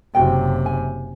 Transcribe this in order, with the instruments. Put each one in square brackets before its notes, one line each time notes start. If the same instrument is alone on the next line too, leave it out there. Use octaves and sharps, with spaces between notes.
[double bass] F#1 C3 [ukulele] F#4 G5
[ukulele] G#5